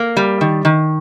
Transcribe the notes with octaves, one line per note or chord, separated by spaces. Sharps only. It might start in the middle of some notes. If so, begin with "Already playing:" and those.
Already playing: A#3
G3
D#3
D#3